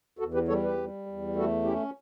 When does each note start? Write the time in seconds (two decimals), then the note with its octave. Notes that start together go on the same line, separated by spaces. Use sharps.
0.19 E2 F#4 A4
0.34 G4 B4
0.48 G3 A4 C#5
0.63 G4 B4
0.77 G3
1.06 E2
1.36 A3 F#4 A4
1.64 C#4 E4 G4